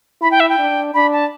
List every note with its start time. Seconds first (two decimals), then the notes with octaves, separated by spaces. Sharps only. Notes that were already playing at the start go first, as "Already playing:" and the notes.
0.22 E4 B5
0.31 G5
0.40 E5
0.49 G5
0.59 D4
0.94 D4 B5
1.12 A5